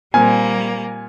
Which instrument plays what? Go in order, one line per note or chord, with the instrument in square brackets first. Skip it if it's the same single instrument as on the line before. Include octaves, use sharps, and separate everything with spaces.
[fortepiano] A#2 C4 [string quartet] G3 A#3 [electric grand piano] G#5